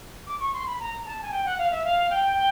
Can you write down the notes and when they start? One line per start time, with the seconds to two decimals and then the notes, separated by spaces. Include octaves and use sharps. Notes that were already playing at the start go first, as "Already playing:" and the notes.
0.26 D6
0.39 C#6
0.53 C6
0.66 B5
0.79 A#5
1.05 A5
1.21 G#5
1.31 G5
1.44 F#5
1.58 F5
1.70 E5
1.83 F5
2.10 G5
2.36 G5